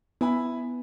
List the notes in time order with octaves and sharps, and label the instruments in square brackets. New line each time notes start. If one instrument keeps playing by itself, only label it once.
[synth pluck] B3 [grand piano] E4 G#5 B5